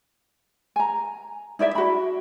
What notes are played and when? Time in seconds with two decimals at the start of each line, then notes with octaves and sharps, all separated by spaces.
0.76 G#5 A#5
1.59 D#4 E4 D5 E5
1.75 F#4 B5